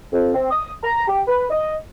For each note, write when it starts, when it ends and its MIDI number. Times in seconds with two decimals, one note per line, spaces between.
0.13 0.31 41
0.34 0.47 60
0.51 0.72 87
0.84 1.07 82
1.08 1.21 67
1.28 1.46 71
1.51 1.75 75